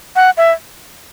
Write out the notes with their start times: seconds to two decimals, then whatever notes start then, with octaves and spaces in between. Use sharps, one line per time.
0.16 F#5
0.37 E5